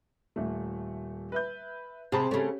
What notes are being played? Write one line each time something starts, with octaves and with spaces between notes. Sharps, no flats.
D#1 A3
B4 E5 G6
C3 G#4 A5 B5
C#3 A3 C#4 G4